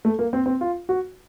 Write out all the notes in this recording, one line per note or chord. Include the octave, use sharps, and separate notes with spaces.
A3
A#3
C4
C4
F4
F#4